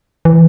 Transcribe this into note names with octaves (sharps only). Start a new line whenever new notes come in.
E3